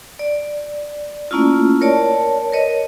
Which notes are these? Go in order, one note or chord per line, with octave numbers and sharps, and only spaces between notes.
D5
A3 A#3 C#4 E4 F4
A#4 C#5 D5 A5
A#4 B4 C#5 D#5